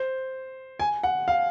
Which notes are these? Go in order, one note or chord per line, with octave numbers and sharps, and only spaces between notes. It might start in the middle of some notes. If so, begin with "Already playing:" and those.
Already playing: C5
G#5
F#5
F5